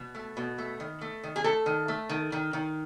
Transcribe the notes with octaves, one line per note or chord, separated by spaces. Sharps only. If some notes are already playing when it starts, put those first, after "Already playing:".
Already playing: B2
A3
B2
A3
D#3
A3
D#3
G#4
A3 A4
D#3
A3
D#3
D#3
D#3